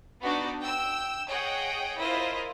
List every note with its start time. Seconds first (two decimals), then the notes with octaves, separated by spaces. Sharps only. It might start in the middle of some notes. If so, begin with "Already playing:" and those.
0.21 B3 D4 D#4 F#4
0.60 G5 E6
1.28 G#4 C#5 D#5 F#5 G5
2.00 E4 F4 A#4 C5 D#5